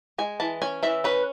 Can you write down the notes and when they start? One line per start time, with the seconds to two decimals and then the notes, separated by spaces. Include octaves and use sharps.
0.18 G#3 G#5
0.40 E3 A5
0.62 C#4 G#5
0.83 E3 E5
1.04 C#4 B4